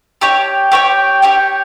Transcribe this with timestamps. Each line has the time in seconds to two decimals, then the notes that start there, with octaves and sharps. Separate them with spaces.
0.21 G4 C#5 G5
0.72 G4 C#5 G5
1.22 G4 C#5 G5